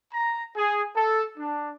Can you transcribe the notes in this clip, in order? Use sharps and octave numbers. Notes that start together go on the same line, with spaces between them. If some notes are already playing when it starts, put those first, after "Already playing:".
A#5
G#4
A4
D4